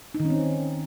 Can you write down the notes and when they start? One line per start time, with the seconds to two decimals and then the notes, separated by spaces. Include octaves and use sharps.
0.14 D#4
0.20 D#3
0.25 C#4
0.30 C4